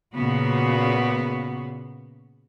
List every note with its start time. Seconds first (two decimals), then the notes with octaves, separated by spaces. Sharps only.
0.14 A#2 C#3 B3 F#4